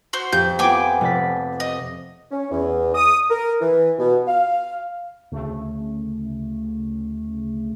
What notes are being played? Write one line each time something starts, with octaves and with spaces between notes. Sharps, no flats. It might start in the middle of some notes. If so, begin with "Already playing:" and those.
F#4 C5
F2 G4 G6
B3 F4 G5 G#5 D6
F1 D5 B6
D#5
C#4
E2
D#6
A#4
E3
B2
F5
D2 C#3 A3